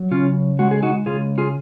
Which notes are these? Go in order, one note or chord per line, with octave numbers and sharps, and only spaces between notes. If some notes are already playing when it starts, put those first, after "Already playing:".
Already playing: F#3
C#3 C#4 F4
G#3 F#4
G#4
D#4 F#4
C#3 F4 G#4
F4 G#4